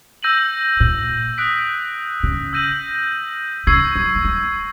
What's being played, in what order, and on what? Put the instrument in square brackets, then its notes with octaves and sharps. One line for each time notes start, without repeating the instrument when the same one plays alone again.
[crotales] E6 G6 A#6 D#7 F#7
[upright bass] A#2
[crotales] D#6 F#6 B6 D7
[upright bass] C#3
[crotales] E6 G6 A#6 D#7 F#7
[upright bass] C#3 [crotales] C#6 E6 G#6 C7
[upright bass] F#3
A3
G#3